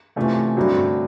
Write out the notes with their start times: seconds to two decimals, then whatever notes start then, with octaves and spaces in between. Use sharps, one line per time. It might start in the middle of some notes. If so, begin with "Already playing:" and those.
0.16 C3 E3 A3 C#4 F4
0.57 G2 D3 F#3 A3 C4